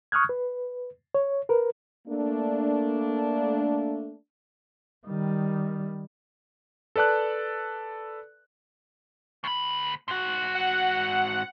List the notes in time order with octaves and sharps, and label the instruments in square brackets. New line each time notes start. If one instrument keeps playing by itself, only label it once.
[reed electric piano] C#6 D#6 F6 F#6 G#6
B4
C#5
A#4 B4
[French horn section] A3 A#3 D4
[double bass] D#3 G3
[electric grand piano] A4 B4 D5 A5 F#6
[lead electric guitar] D2 B5
G#2 F#4
[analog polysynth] F#5